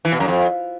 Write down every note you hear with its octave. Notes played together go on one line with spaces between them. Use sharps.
E3
B2
F#2
F2